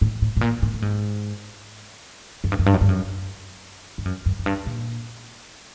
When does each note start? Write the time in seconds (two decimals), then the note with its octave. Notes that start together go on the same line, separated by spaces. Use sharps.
0.01 A2
0.22 A2
0.37 A2
0.41 A#2
0.62 A2
0.74 A2
0.82 G#2
2.44 F#2
2.52 G2
2.59 F#2
2.66 G2
2.74 F#2
2.81 G2
2.89 F#2
3.98 G2
4.05 F#2
4.26 F#2
4.39 F#2
4.46 G2
4.66 A#2